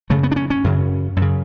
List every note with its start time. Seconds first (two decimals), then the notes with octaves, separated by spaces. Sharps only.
0.10 F#2 C#3 A3
0.23 B3
0.32 D4
0.36 C#4
0.50 C#4
0.64 F#2 C#3
1.16 F#2
1.22 C#3